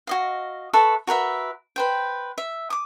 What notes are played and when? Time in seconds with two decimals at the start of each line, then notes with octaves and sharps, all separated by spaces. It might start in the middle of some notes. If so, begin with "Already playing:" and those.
0.07 F#4 D#5 F5
0.73 A4 B4 E5 C#6
1.07 F#4 A#4 B4 E5
1.76 B4 C5 G5
2.38 E5
2.70 D6 D#6